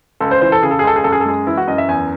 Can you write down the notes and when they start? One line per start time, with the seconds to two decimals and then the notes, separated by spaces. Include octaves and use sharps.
0.20 C#2 A4
0.31 C5
0.41 E3 C5
0.52 A4
0.63 C#3 G#4
0.71 A4
0.79 G#4
0.83 C#2 A4
0.96 G#4
1.04 F#2 A4
1.12 G#4
1.21 A4
1.26 G#3 G#4
1.46 E3 E4
1.57 F#4
1.67 F#2 D#5
1.78 E5
1.89 E2 G#5